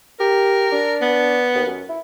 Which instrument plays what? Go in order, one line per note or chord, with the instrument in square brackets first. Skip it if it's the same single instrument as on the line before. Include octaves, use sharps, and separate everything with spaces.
[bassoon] G4 [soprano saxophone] A#4
[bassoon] D4
[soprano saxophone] B3
[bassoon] D#2
F#2
E4